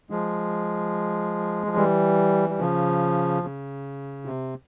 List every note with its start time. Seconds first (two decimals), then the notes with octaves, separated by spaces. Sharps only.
0.10 F3 G#3
1.67 F3
1.76 E3 G3
2.49 G3
2.59 C#3 F3
3.43 C#3
4.25 C3